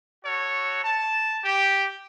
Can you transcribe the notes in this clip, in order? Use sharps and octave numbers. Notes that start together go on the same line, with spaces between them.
F#4 A4 C#5
A5
G4